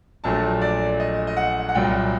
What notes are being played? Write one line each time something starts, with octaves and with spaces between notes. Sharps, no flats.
A#1 A#2 F#3 A3 A5
D5
D#5
D#5
F#5
F#5
C2 A#2 F#3 G5